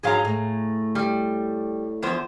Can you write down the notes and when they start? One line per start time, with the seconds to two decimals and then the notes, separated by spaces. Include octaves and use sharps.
0.03 G#2 F3 F#3 G#4 F5 A#5
0.25 A2
0.95 G3
2.02 E2 F3 C5